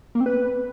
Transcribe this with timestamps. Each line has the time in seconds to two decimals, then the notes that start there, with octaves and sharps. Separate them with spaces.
0.15 A#3
0.20 C4
0.26 B4